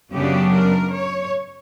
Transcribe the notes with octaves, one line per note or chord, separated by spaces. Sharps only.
F#2 C#3 F#3 B3 D4 G4
A#4
C#5